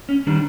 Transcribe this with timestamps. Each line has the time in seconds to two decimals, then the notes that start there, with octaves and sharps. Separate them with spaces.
0.09 C#4
0.27 D#3 G3 D4